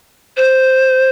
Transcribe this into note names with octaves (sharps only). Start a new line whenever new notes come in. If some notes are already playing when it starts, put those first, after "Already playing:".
C5